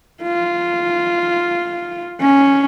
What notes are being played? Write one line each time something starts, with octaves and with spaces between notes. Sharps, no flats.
F4
C#4